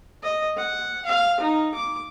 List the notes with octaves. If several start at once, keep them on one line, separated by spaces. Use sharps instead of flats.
D#5
F#5
F5
D#4
D6